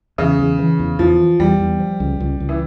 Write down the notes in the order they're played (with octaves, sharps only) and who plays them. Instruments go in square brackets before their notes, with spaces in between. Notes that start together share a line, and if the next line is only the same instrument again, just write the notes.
[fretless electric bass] E2 [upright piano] C#3
[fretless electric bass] E2
E3
E2
[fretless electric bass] E2 [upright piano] F3
[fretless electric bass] E3
[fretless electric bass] E2 [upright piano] G3
[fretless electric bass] E2
F3
C#2
C#2
C#2
[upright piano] E3